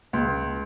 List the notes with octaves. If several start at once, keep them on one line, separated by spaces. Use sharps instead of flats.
C#2